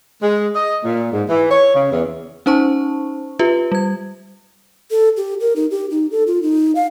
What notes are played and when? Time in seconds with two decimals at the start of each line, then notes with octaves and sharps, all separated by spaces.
0.23 G#3
0.55 D#5
0.84 A#2
1.12 G#2
1.29 E3
1.51 C#5
1.75 C#3
1.92 E2
2.46 C#4 D#4 C5 A5 C#6
3.39 F4 G4 B4 E5
3.72 G3 G#6
4.91 A4
5.17 G4
5.41 A#4
5.56 D#4
5.71 G4
5.90 D#4
6.11 A4
6.27 F4
6.43 D#4
6.75 F5